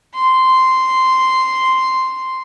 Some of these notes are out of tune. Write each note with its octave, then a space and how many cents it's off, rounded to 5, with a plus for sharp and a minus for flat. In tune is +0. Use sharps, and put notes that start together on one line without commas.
C6 -5